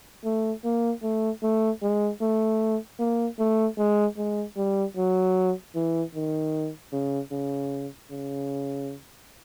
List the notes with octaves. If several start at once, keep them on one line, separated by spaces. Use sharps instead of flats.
A3
A#3
A3
A3
G#3
A3
A#3
A3
G#3
G#3
G3
F#3
E3
D#3
C#3
C#3
C#3